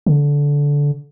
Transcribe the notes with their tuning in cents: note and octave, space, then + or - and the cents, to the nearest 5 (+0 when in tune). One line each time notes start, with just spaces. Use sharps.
D3 -20